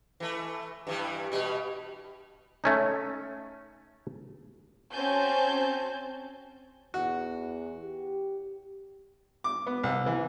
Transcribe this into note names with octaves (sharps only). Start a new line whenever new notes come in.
E3 A3
G2 E3 G3
B2 G3
A3 C#4 D#4
C4 C#4 F#4 G#5 A5 G6
E2 F#4
G4
D6
B3
C2
E3